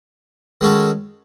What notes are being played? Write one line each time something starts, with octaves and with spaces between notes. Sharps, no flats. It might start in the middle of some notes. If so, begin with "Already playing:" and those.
D#3 G#3 C#4 F#4 A4